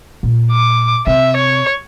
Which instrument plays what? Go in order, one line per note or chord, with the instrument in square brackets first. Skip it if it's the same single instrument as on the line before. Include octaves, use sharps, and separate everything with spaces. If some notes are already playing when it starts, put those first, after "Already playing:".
[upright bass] A#2
[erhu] D6
[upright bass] C3 [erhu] E5
[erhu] C#5